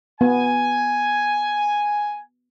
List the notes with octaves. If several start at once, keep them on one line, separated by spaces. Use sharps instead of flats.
B3 G#5